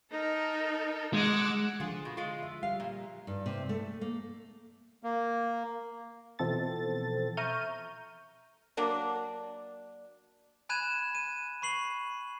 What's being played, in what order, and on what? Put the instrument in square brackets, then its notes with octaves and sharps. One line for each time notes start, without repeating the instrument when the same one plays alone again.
[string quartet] D#4 A4 A#4
[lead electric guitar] G#3 [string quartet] F#5 D6 E6
[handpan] D3 F3 [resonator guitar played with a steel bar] F4 G#4
[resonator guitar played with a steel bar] B2
G#3 F4
[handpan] E5
[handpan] G3 [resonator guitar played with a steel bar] F5
[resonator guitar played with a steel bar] A#2
[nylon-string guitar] G2
C3
A3
A#3
[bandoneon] A#3
[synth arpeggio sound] B2 E3 F3 C4 A4 A6
E5 A#5 C#6 F6 G6 D#7
[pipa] F#3 A#3 D4
[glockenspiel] G#5 B5 F#6 G#6 D#7 E7
D#7
B5 C#6 C7 F#7